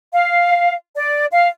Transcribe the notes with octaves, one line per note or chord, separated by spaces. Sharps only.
F5
D5
F5